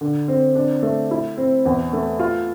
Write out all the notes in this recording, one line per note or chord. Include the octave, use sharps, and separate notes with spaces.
D3
C4
D4
A3
E4
C4
E2
A3
F4